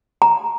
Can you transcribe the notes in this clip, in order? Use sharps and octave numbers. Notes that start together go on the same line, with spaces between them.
A#5